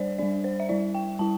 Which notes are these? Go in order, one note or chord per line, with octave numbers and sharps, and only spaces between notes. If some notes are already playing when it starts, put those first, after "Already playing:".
Already playing: G3 D4 C5 D5
G3 D4 D5
C5
E5
G3 E4 D5
G5
G3 E4 A5